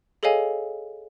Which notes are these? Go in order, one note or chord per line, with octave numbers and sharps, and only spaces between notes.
G#4 A4 C#5 D#5 F5 G#5